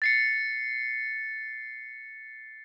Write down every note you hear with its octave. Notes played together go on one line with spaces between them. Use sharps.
A6 C7 C#7